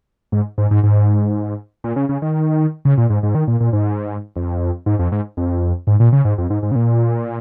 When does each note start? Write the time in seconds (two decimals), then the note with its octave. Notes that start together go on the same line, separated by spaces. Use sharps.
0.32 G#2
0.58 G#2
0.71 G#2
0.83 G#2
1.84 A#2
1.96 C#3
2.09 C#3
2.22 D#3
2.85 C#3
2.98 A#2
3.10 G#2
3.23 G#2
3.35 D#3
3.48 A#2
3.60 A#2
3.73 G#2
4.36 F2
4.86 G#2
4.99 F2
5.12 G#2
5.37 F2
5.87 G#2
6.00 A#2
6.12 C#3
6.25 G#2
6.38 F2
6.50 G#2
6.63 G#2
6.71 C#3
6.75 A#2